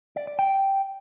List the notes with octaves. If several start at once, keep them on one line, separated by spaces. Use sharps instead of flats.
D5
D5
G5